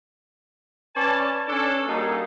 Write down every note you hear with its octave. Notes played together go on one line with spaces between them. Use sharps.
C#4 B4 D5 A5
C#4 D4 A4
G3 A#3 D#4 F#4 G#4 A4